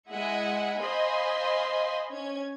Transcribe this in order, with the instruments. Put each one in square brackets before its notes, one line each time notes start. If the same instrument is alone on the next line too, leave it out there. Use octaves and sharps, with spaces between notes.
[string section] G#3 E4 D#5 E5 F#5 G#5
C5 D#5 F5 G#5 B5 C6
C#4 G#6